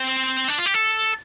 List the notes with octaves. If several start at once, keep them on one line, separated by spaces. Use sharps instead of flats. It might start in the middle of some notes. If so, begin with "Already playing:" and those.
Already playing: C4
D4
F4
G4
A4